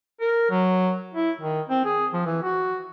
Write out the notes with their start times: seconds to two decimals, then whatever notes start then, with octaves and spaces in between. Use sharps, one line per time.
0.21 A#4
0.50 F#3
1.14 E4
1.41 D#3
1.69 C4
1.85 G#4
2.13 F3
2.26 E3
2.43 F#4